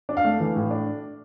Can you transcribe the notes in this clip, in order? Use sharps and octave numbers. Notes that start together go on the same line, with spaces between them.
D4
F5
A3
E3
A2
D4